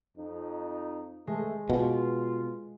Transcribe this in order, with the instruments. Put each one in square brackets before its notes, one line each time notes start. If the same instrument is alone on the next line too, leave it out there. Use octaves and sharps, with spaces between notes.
[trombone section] F2 D#4
[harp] G#3 [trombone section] A3
[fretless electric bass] B2 [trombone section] F4